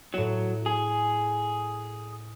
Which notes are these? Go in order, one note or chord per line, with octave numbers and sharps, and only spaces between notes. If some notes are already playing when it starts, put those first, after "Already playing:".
A2 F#3 E7
G#4